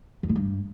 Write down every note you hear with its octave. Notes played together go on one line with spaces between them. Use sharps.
F2
A2
G2